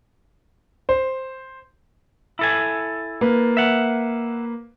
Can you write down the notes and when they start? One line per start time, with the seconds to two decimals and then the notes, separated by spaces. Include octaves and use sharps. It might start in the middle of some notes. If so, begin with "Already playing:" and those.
0.89 C5
2.39 E4 A4 G#5
3.21 A#3 B4
3.57 E5 F#5